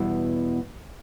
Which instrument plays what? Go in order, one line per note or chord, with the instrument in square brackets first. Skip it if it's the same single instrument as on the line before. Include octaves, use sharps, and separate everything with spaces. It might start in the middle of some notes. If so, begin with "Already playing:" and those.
Already playing: [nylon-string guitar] E2 B2 G3 B3 E4